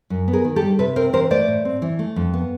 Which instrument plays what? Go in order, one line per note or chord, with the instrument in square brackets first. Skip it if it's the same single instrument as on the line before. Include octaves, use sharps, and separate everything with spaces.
[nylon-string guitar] F#2
B3
G#4 A#4
D#3
G4 A4
G3
C3 A4 B4
C4 A#4 C5
E3 A#4 C5
A3 C5 D5
A2
C4
E3
A3
F2
B3